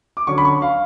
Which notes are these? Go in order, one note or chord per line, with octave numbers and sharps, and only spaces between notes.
D6
D3 F#3 C#4 C#6
B5
C#6
F5